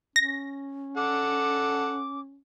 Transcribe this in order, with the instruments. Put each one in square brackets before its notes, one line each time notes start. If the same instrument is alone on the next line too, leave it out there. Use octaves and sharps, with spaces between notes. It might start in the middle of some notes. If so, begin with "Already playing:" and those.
[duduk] C#4 [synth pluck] A#6
[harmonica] A4 F#5 [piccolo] D6